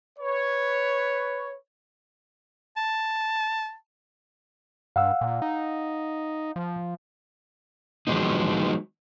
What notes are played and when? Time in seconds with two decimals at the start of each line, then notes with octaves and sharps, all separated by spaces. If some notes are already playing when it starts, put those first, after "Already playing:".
0.19 B4 C#5
2.77 A5
4.96 G2 F5 F#5 E6
5.21 A#2
5.42 D#4
6.56 F3
8.07 D#3 F3 F#3 G#3 B3 D#4